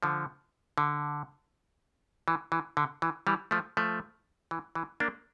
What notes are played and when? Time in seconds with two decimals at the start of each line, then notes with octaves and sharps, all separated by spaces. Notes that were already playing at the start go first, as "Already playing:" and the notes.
0.03 D3 F3
0.78 D3
2.28 E3
2.52 E3
2.77 D3
3.02 E3
3.27 E3 G3
3.51 F3 A3
3.77 F3 A3
4.51 E3
4.75 E3
5.00 A#3 D4